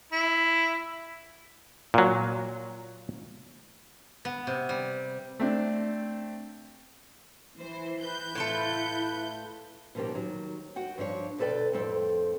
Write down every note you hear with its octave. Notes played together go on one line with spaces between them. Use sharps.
E4
A#2 F#3
B3
C3
G3
A3 C4 D4
E3 C5
B4 G6
A2 E4 F4 A4
B2 D#3 F3 A#3 C#4 G4
D#3 F#3
F#4 F#5 G5
G2 F3 D4 C#5
D2 B2 A4 B4 D5 G5
F2 A2 C4 A4 G5